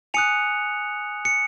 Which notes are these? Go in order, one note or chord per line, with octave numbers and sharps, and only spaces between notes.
G#5 D#6 F#6 C#7 F7
C#7